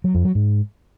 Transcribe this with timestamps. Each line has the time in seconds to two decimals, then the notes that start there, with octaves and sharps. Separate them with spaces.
0.04 F#3
0.15 F2
0.25 F#3
0.35 G#2